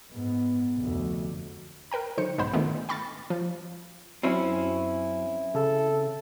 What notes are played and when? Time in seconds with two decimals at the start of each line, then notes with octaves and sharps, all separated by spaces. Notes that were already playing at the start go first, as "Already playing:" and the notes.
0.12 G#2 B3
0.78 F1 D2
1.91 A#4 B4 G5 A#5
2.18 D3 F#3 D#4 C5 C#7
2.38 B1 G#2 G#3 B3 C5 B5
2.53 A#2 D3 D#3 G#3 A3 B3
2.89 G5 B5 C#6 F6 A6
3.30 F3
4.23 F#2 C4 C#4 E4
5.55 C#3 A4